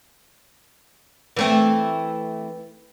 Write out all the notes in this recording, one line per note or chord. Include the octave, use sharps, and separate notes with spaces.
E3 A3 C4